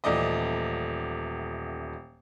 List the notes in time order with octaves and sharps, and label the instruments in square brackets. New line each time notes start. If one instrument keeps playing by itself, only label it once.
[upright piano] D#1 E3 A3 D5 D#5